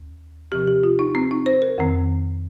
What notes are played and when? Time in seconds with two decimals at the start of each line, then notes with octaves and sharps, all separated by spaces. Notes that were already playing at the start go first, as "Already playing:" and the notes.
Already playing: D#2
0.51 C3 F3 C4 G4
0.67 G4
0.83 F4
0.99 D#4
1.15 C4
1.31 D#4
1.46 C5
1.62 A#4
1.78 F2 D#3 C4